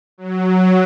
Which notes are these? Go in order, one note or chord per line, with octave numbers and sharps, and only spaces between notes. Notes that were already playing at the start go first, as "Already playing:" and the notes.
F#3